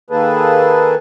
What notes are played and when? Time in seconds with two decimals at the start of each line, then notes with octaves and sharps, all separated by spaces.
0.10 D#3 A#3 G#4 A4 B4